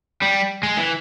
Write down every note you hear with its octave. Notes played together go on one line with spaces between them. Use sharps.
G3
G#3
E3